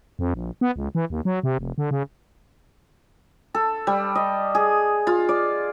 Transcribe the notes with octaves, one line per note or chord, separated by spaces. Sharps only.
F2
A#1
B3
C#2
E3
D#2
F#3
C3
F1
D3
C#3
A4
G3
D#5
G#4
F4
D5